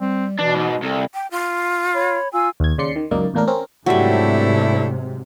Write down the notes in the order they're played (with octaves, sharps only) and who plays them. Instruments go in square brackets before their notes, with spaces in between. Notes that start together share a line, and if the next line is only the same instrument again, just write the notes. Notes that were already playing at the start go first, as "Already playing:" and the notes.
[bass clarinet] G3 [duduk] C4
[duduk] B2 [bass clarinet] E3 [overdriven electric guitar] D4
[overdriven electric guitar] G#2
[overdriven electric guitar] C2 [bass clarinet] A4
[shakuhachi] G5
F4
[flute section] C#5 B5
[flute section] F4 E6 [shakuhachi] G#5
[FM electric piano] D#2 G#6
D#2 C#3 D5 C6 C7 C#7
D#3
C#2 F#2 A#3 D#4 D5
E2 A2 A#3 D4 A#4
C4 C#4 A#4
[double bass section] G#2 C3 [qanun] F#3 G3 [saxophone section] A3 D4 E4